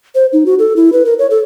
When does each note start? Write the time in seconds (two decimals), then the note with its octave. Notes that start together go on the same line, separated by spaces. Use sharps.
0.15 C5
0.33 D#4
0.46 F#4
0.59 A4
0.76 E4
0.93 B4
1.05 A#4
1.19 C#5
1.30 A4